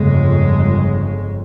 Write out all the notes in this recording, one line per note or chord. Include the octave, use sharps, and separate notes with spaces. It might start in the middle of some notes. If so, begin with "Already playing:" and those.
Already playing: G1 F2 C#3 G#3